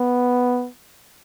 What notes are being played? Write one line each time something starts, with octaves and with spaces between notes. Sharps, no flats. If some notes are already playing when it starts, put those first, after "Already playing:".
Already playing: B3